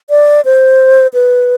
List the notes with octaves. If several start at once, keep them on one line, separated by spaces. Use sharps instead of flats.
D5
C5
B4